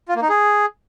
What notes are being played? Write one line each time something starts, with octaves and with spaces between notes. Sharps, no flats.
F4
A#3
D#4
G#4